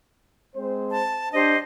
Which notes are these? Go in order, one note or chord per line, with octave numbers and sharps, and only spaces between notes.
G#3 C4 C5
A5
D4 G4 C5 D#5